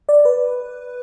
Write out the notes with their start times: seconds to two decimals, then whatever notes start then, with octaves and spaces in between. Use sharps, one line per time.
0.09 D5
0.25 B4